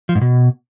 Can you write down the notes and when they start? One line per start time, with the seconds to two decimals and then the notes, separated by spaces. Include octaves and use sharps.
0.09 F3
0.15 G#2
0.21 B2